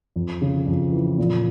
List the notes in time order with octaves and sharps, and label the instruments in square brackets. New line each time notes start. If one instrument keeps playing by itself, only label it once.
[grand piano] F2
C#3
F2
E3
A#2